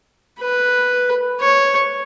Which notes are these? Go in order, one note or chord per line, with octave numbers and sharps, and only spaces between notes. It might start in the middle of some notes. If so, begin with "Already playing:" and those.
B4
C#5